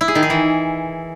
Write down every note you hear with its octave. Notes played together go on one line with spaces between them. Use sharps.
E4
G#4
D#3
G#4
E3